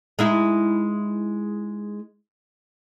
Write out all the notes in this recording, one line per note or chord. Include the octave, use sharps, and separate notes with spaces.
G#3 D#4 E4